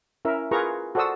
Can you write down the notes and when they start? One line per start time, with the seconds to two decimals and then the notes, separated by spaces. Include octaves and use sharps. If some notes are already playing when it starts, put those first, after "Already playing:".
0.25 C#4 E4 A#4 E5
0.51 F4 G#4 A#4 B4 A#5 C#6
0.95 F#4 A4 C5 D5 D#6 E6